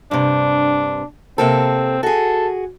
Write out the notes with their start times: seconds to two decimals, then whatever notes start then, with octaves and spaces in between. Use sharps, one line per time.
0.11 G2 C3 D4
1.38 C3 A#3 C4 A4
2.03 F#4 G#4 A4